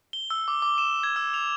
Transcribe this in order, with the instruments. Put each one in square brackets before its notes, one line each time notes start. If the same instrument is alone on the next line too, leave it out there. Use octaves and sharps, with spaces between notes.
[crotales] G7
E6
D6
D6
E7
G#6
E6
F7